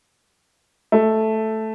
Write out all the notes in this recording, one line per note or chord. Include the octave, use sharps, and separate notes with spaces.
A3